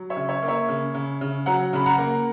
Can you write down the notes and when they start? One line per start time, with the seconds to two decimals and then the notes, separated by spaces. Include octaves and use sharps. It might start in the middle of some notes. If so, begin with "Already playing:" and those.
Already playing: F#3
0.10 C#5 E5
0.16 C#3
0.29 C#5 E5
0.43 A#3
0.48 C#5 E5
0.68 C#3
0.94 C#3
1.21 C#3
1.46 F#3 F#5 A#5
1.73 C#3 B5
1.86 F#5 A#5
1.98 A#3